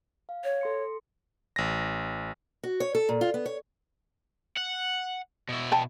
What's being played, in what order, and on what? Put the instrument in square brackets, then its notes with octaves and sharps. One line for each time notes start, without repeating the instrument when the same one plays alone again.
[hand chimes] F5
[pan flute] C#5
[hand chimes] A4 C6 C#7
[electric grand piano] A1 A#6
[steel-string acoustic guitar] F#4
C#5
A4
A#2
F4
B3
C#5
[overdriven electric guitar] F#5
B2 E4
[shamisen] D5 G5 A5